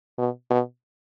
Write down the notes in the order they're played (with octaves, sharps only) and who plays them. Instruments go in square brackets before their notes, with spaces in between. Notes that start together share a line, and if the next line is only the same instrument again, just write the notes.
[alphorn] B2
B2